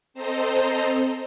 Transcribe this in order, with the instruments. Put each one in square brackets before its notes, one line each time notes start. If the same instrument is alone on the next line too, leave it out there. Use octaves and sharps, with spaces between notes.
[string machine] C4 A4 C5 D#5 A#5